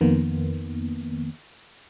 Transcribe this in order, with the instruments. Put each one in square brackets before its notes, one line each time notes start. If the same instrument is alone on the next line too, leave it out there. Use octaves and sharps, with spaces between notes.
[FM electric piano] F2 D#3 A#3 B3